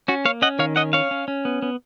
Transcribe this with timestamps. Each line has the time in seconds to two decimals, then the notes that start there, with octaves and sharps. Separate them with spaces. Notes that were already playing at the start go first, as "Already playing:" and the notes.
0.08 C#4 F#4
0.25 A#3 C#5 F5
0.42 C#4 D#5 F#5
0.59 D#3 C#5 F5
0.76 C#4 D#5 F#5
0.93 C#4 C#5 F5
1.11 C#4
1.28 C#4
1.45 B3
1.62 B3